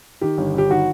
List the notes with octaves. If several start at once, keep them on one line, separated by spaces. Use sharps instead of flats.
D#3 G4
G1
G1 G4
D#3 F#4